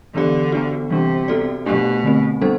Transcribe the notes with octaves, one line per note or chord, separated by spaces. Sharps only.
D3 E3 B3 D4 G4 D5
B3 D4 F#4
C3 E3 G3 D4
B3 F#4 A4 D5
B2 A3 D4 G4
D3 A3 C4
G3 B3 D4 A4 C5